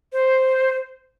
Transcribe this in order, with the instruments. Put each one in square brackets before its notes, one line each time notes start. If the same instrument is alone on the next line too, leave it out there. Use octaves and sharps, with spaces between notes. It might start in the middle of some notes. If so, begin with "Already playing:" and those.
[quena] C5